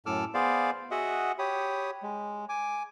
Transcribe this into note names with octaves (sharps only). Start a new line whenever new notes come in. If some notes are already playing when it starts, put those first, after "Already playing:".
F#2 A2 A4 D6 E6 F6
B3 G#4 C5 D5 F5
F#4 G#4 D#5 E5 F#5
G4 C#5 B5 D#6
G#3
G#5 D6